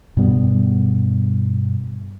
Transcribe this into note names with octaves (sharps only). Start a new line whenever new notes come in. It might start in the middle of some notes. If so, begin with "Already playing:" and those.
G2 B2 G3 B3